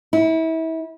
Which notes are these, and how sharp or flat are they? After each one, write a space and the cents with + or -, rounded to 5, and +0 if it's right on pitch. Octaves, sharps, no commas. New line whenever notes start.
E4 -30